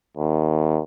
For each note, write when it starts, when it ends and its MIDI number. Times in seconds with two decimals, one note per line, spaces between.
0.17 0.82 39